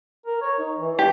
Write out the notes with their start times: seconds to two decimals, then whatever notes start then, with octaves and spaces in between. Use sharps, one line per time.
0.26 A#4
0.41 C#5
0.58 D#4
0.78 E3
0.99 G4